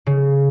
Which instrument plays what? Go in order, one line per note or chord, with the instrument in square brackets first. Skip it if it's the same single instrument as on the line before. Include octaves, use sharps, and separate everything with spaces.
[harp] C#3